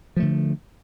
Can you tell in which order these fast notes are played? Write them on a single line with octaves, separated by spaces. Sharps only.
F3 A3 D3